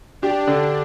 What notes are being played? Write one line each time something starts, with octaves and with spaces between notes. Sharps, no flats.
D4 G4
D3